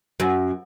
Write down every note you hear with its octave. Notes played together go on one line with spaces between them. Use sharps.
F#2